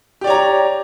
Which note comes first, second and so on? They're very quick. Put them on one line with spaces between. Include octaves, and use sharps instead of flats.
G4 D5 C#5 A#5